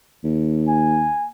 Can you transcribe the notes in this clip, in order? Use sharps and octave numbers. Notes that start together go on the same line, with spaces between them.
D#2
G#5